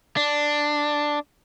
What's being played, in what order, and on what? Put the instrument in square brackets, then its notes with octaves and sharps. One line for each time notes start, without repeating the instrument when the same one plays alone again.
[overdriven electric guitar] D4